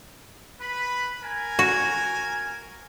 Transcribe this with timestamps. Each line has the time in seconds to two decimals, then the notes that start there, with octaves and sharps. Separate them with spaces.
0.61 B4 B5
1.23 A#4 G#5
1.59 F#4